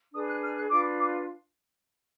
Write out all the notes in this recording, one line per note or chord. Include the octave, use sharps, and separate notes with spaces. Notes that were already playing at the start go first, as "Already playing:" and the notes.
D4 G#4 B4 D#6
F#6
F6
F#6
D4 F4 B4 D6
D6